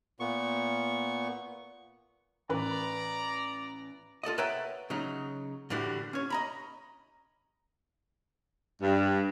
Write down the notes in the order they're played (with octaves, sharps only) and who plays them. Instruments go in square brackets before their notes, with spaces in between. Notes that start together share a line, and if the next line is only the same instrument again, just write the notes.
[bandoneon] A#2 B3 C#6
[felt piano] A1 B4 B5 [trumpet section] D5 A#5
[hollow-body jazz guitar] F4 A4 D5 D#5
B4 C#5 E5 F#5 G5 A#5
C#3 F#3 D#4
A2 D3 E3 G3 D4 F#4
C#4 C#5
D#5 A#5 B5
[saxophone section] G2